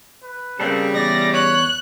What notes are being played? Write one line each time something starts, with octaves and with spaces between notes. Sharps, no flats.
B4
C#3 G3 A#3 C4 A4
E2 D5 A#6
C#5 F#6